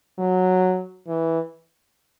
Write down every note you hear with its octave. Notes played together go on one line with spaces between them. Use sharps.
F#3
E3